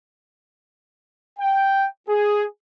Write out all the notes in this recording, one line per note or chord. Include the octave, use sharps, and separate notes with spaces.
G5
G#4